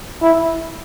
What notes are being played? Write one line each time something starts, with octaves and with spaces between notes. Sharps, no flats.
E4